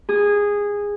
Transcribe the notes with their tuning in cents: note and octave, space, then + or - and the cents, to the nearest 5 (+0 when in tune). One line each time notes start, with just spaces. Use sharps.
G#4 -15